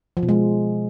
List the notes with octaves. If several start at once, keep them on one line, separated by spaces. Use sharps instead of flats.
F3
B2
G#3